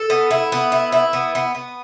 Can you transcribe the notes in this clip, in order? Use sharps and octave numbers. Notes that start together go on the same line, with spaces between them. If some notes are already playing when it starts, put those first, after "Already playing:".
Already playing: A4
B3
E4
B3
E4
E4
B3
B3
B3